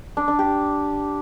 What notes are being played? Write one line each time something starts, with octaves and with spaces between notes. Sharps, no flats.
D4
D4
G4